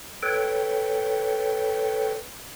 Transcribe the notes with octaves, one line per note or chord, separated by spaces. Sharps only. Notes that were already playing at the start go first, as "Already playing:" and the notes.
A4 B4 C#5 G5